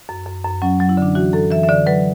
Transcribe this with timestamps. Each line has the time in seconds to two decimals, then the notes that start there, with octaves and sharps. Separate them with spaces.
0.09 F#2
0.27 F#2
0.45 F#2
0.62 F#3 C#4
0.80 F#3
0.89 E4
0.97 D3 D4
1.15 E3 F#4
1.33 F#2 A4
1.51 E3 E5
1.63 E5
1.69 D3 D5
1.86 F#3 B4